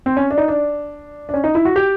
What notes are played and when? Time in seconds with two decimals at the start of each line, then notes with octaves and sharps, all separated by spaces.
0.06 C4
0.17 C#4
0.31 D4
0.38 D#4
0.48 D4
1.29 D4
1.34 C#4
1.44 D#4
1.55 E4
1.65 F#4
1.76 G4